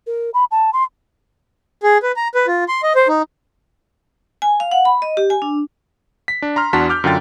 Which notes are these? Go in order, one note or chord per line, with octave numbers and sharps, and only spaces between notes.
A#4
B5
A5
C6
G#4
B4
A#5
B4
F4
C6
D#5
C5
D#4
G#5
F5
F#5
B5
D#5
G4
G#5
D4
B6
D4
A#5 C6 F6
E2 D4 F#4 A5 C6 B6
D6 F6 G6
F#2 D3 F4 G5 A6